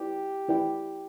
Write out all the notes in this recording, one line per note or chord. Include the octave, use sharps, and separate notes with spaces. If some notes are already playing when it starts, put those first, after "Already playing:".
Already playing: E4 G4 B4 D5
E4 B4 D5 G5